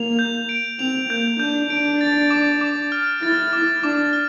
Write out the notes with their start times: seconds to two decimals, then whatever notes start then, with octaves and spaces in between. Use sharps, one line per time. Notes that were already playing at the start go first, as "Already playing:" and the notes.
Already playing: A#3 F7
0.19 G6
0.49 D7
0.79 C4 F7
1.09 A#3 G6
1.40 D4 G6
1.70 D4 D7
2.01 A6
2.30 D6
2.61 D6
2.92 F6
3.23 E4 A6
3.53 D6
3.83 D4 D6
4.13 F6